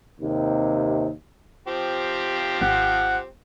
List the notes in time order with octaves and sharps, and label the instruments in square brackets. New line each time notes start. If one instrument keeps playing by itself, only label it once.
[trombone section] D#2 C3
[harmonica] F3 C4 G4
[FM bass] G#1 [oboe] F#5